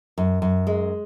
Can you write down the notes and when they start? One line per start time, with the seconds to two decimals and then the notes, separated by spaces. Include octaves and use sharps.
0.18 F#2
0.42 F#2
0.67 G#3